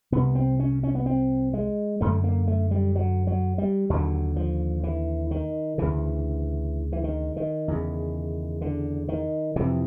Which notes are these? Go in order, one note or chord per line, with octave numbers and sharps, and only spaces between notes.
C2 C3 B3
C4
C#4
C#4
B3
C4
G#3
F#2 D3 A3
A#3
A3
G3
F#3
F#3
G3
D#2 D3 F#3
F3
E3
D#3
D2 C#3 E3
E3
D#3
D#3
E2 C#3
D3
D#3
F2 C3 E3